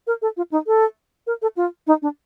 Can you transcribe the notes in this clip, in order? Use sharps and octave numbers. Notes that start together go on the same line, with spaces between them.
A#4
A4
F4
D#4
A4
A#4
A4
F4
D#4
D4